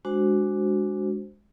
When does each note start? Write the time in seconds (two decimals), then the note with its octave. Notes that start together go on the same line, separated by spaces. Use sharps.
0.05 G#3 D4 F#4 C5